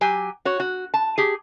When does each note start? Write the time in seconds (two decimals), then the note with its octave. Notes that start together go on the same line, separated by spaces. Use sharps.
0.01 F#3 G4 G#5
0.45 F#4 C#5
0.60 F#4
0.94 A5
1.18 G4 G#4